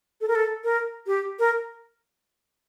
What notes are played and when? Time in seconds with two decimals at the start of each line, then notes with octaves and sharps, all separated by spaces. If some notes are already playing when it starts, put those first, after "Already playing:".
0.21 A4
0.28 A#4
0.35 A4
0.64 A#4
1.07 G4
1.39 A#4